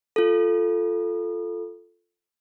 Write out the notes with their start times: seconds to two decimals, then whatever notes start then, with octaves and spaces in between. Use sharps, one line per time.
0.16 F4 A4